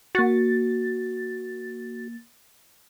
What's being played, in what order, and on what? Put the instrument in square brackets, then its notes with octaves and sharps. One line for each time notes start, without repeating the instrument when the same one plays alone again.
[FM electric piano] A#3 A6 [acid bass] F#4